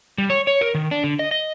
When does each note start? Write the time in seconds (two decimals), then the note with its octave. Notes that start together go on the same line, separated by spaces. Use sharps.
0.18 G3
0.30 C#5
0.47 C#5
0.61 A#4
0.75 D#3
0.91 D4
1.04 D3
1.19 D#5
1.31 D#5